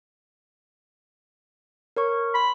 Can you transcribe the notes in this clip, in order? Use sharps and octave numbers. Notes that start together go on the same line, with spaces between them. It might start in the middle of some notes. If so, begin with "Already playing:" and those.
A#4 C#5 C#6
B5 C6